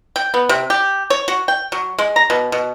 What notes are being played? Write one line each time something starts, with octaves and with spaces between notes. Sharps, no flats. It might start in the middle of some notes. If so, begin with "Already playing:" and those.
G5
B3
C3
G4
C#5
F#4
G5
F#3
G#3
A#5
B2
B2